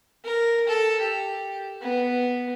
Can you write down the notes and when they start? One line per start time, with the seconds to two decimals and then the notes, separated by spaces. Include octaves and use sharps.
0.25 A#4
0.67 A4
1.00 G4
1.81 B3